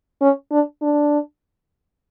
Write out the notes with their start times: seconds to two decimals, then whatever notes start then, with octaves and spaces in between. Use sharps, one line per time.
0.21 C#4
0.51 D4
0.82 D4